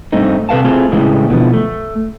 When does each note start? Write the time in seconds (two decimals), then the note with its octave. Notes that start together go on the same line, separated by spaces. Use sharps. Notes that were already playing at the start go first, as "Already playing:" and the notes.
0.12 G2 A3 C4 D#4
0.49 C3 A4 B4 F5 F#5 A5
0.64 A3 C4 E4 F4 G#4 A4
0.92 A2 C#3 E3 G3 G#3
1.30 B2 D3 E3 F3 B3
1.54 A3